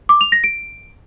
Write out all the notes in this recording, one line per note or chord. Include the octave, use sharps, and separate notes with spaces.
D6
F7
A#6
D7